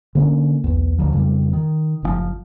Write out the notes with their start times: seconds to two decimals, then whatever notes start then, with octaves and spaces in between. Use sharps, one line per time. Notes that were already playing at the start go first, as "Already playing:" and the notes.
0.15 D3 A#3 C#4
0.64 B1 E2
0.98 D1 D2 F3
1.13 F2 C#3 E3 G3
1.53 D#3
2.02 F#1 C3 F3